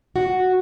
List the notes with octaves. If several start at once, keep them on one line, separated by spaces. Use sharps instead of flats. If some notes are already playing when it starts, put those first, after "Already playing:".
F#4